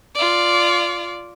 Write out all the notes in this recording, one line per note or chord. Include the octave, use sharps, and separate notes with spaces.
F4 D5